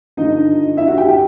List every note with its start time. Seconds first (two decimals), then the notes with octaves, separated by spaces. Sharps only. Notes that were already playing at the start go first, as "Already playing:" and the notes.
0.17 G2 D3 F3 D#4 D#5
0.77 E4 E5
0.87 F#4 F#5
0.98 G4 G5
1.09 G4 G5